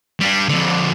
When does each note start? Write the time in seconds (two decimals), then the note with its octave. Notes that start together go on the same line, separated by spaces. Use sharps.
0.21 G3 D4
0.49 F2 D3